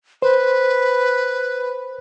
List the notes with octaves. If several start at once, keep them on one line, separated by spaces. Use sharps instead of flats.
B4 C5